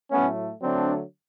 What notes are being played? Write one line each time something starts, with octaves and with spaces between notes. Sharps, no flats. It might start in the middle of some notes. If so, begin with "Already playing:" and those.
A2 F#3 A3 B3 C#4
D3 F#3 A3 C4 D4